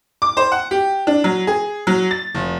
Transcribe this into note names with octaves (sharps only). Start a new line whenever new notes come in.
D6
C5
F#5
G4
D4
F#3
G#4
F#3
A6
F1